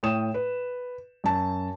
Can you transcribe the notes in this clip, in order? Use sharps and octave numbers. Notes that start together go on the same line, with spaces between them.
A2 C#5 G5 D#6 E7
B4
F#2 A5